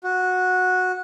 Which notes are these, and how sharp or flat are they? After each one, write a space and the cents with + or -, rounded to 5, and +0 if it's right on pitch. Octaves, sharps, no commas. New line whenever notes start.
F#4 -10